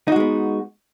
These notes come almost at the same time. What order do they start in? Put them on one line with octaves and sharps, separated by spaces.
D#4 F#4 G#3 B3